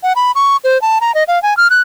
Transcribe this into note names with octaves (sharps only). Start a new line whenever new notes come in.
F#5
B5
C#6
C5
A5
A#5
D#5
F5
G#5
F6
F#6